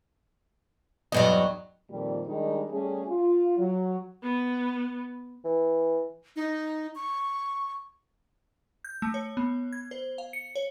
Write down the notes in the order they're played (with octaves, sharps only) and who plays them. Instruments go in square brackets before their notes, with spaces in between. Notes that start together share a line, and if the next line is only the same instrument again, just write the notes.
[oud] E2 G2 F#3 [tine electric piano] D#5
[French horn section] F2 A#2 D#3 G3
D#3 G3 G#3 D4 D#4
G3 A3 C#4 G#4
F4
F#3
[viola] B3
[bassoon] E3
[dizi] D#4
C#6
[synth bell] G6
A3
C#5
B3
G#6
C5
F5
C#7
C#5